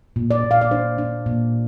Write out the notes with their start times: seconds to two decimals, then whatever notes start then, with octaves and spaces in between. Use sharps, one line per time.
0.16 A#2
0.31 D5
0.44 A#2
0.51 F5
0.61 D5
0.71 D4 C5
0.98 D4
1.26 A#2